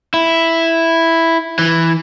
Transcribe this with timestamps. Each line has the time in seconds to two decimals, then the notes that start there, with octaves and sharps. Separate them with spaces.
0.14 E4
1.59 E3